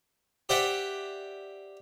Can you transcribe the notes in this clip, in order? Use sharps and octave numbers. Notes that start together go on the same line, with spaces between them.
G4 C5 D5 E5 F#5